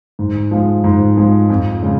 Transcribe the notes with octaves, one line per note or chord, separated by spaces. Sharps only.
G#2
F3 G#3
G#2
F3 G#3
F2
C#3 G#3